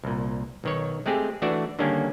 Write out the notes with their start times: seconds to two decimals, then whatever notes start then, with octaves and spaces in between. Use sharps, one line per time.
0.04 C2 A#2
0.64 B1 D#3 C#5
1.06 G#3 A3 C4 G4 G#4
1.42 E3 A3 D4 F#4 D5 E5
1.79 D3 D#3 G3 A#3 C#4 D4